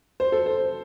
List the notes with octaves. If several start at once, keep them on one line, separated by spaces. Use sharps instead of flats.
C5
A4
C5